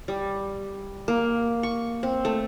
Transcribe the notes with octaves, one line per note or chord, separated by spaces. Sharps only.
G3
A#3
C#6
C4
A3